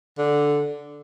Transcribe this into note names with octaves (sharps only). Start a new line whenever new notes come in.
D3